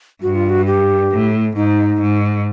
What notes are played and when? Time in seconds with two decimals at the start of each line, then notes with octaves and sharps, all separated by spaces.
0.22 G2 F#4
0.36 F4
0.49 F#4
0.67 G4
1.12 A2
1.56 G#2 D#4
2.01 G#2